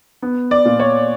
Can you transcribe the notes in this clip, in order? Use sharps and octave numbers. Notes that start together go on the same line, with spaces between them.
B3
D5
A#2
C#5